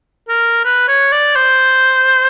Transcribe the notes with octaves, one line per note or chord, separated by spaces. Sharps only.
A#4
B4
C#5
D5
C5